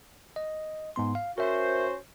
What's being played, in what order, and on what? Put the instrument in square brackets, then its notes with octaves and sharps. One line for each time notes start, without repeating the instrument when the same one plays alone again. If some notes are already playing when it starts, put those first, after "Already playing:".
[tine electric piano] D#5
G#2 B3 C6
F5
[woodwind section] C#4 F#4 C5 [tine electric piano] A#4 E5